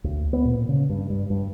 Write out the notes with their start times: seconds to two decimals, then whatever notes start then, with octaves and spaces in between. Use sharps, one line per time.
0.04 D2
0.33 B3
0.45 A#2
0.69 C#3
0.89 G2
1.10 G2
1.30 G2